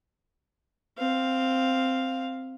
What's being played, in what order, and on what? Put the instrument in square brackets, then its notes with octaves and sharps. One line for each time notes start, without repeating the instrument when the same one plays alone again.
[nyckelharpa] C4 F5